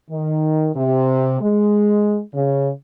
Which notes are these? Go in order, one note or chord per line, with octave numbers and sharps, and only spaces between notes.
D#3
C3
G#3
C#3